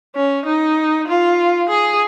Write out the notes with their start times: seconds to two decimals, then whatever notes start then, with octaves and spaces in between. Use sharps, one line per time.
0.15 C#4
0.46 D#4
1.08 F4
1.69 G#4